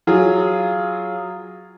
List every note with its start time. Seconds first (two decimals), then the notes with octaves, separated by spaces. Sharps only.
0.07 F#3 F4 G#4